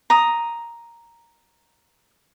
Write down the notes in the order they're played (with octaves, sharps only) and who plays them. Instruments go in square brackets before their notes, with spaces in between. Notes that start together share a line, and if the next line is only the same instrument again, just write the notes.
[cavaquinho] A#5 D#6